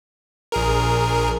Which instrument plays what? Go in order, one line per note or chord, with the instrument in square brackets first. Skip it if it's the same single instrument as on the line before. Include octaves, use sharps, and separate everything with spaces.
[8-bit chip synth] A#1 G#4 A#4